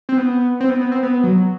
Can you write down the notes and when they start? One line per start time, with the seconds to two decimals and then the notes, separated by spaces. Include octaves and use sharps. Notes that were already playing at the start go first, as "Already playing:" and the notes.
0.09 C4
0.18 B3
0.60 C4
0.70 B3
0.81 B3
0.92 C4
1.03 B3
1.23 F#3